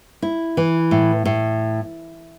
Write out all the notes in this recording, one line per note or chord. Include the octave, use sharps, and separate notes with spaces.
E4
E3
A2
A2